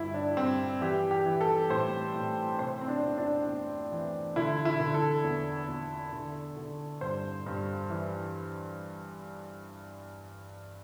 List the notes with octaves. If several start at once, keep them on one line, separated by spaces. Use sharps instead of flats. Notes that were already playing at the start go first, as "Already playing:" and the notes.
Already playing: G2 D3 E4 G4
D4
G2 C4
E3 G4
G4
E3
A4
A2 C5
A2
C3 C5
C4
D4
E2
D4
E2
E3
D3 E4
E4
D3
A4
E2
E2
D3
D3
G2 C5
G2
E3